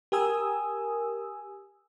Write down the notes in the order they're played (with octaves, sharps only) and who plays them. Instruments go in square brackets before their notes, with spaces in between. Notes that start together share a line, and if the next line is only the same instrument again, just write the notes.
[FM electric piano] G4 A#4 G#5 D#6 E6